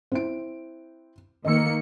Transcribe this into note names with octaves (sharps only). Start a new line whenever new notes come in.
C4 E4 D7
D#3 A#3 D#5 E6 C#7